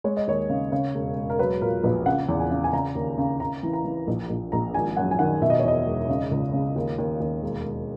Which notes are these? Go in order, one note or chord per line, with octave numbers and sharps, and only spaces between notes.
G#3 C#5
D#5
D#2 C#5
C#3
C#3
E1
E1
A#4
F#3 B4
A#2 A#4
A#1 B4
C#3 F#5
E2
G#5
C#3
G#5
C#3 A#5
D#2
C#3
C#3 A#5
E3
A#5
E3
A#1
A#1
A#1 A#5
G#1 G#5
F#2 F#5
G#5
D#3 F#5
B2 E5
D#5
C#5
E2 D#5
E1
C#3
C#2
C#3
D#2
D#2
D#2
E1
E1